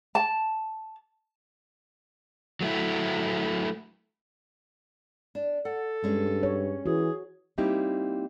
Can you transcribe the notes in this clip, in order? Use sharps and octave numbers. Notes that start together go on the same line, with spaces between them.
A5
F#3 A3 E4
D4
A4 F#5
G2 G#3 C#4
C#5
E3 F#4 G#4
G3 A#3 C4 D#4 E4 G4